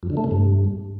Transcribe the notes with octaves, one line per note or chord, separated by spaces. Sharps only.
F2
D3
A3
C3
G2